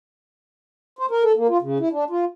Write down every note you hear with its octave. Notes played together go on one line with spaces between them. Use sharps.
C5
A#4
A4
A#3
F4
C#3
E4
D4
F4